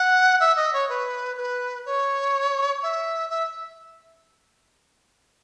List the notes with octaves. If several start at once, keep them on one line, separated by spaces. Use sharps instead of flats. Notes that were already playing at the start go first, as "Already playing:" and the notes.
Already playing: F#5
E5
D#5
C#5
B4
B4
C#5
E5
E5